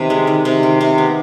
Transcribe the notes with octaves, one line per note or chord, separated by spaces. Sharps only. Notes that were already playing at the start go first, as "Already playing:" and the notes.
Already playing: C3 D#3 B4
G#3
D#3
C3
D#3
C3
B3